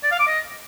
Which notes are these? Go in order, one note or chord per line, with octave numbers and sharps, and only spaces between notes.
D5
F5
D6
D#5